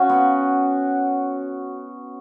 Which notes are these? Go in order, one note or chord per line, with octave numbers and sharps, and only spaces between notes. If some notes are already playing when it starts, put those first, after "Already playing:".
Already playing: C#4 F#4
B3